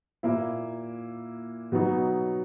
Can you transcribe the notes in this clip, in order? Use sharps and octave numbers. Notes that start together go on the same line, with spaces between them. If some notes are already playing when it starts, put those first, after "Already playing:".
A#2 A#3 E4
B2 F#3 B3 D#4 F#4